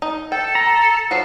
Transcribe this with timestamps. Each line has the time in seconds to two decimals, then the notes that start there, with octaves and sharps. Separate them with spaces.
0.02 D#4
0.32 A4 G5
0.55 A#5
1.11 F3 F#3 F#4 C6